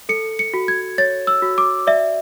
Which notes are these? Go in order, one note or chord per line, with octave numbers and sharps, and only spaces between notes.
A4 C#7
C#7
F#4
G#6
C#5 A6
E6
F#4
D6
D5 E5